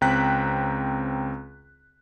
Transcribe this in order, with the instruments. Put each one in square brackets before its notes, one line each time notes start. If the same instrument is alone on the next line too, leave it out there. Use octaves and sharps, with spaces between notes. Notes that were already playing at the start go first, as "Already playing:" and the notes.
[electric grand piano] C#2 C4 G5 A#5 F#6 B6